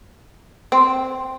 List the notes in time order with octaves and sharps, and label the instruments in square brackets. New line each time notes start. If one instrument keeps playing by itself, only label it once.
[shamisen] C4